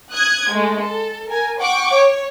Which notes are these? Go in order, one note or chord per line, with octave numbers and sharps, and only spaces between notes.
D#6 F#6 G#6
G#3 A3
A4
A#4 G#5
F#5 G5 C#6 D6
C#5